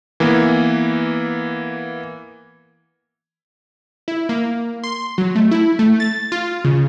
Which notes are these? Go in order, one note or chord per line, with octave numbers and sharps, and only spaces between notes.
E3 A#3 B3
E4
A#3
C6
F#3
A3
E4
A3
A6
F4
C#3